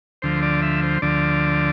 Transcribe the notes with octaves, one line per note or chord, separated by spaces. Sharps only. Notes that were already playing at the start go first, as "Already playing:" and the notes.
D2 D3 F3 C5
D5
E5
C5
D2 D3 F3 D5